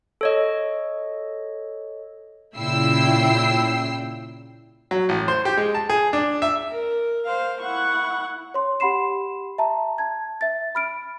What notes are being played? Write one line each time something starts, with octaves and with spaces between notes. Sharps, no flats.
A4 C#5 D#5
A#2 C#3 E4 G5 E6 C7
F#3
A1
C5
G4
G#3
A5
G#4
D4
E5
A#4
C5 F5
E4 F#5 C#6
C#5 C6
G4 F#5 B5 C6 C7 E7
E5 A5 A#5
A5 G#6
E5 A6
B5 F6 D7